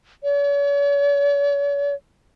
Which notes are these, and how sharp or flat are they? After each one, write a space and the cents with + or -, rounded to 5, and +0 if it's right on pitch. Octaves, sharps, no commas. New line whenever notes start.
C#5 +45